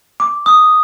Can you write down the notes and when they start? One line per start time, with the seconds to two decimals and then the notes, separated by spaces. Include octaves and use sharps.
0.20 D6
0.46 D#6